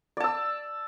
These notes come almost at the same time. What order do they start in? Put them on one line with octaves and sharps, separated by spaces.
D5 A5 E6